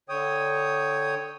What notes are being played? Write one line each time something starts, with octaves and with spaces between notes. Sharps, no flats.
D3 C#5 G5 D#6